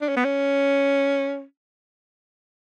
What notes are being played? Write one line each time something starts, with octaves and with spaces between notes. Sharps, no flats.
D4
C#4
B3
C#4